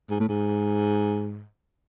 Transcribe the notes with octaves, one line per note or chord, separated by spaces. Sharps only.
G#2
A2
G#2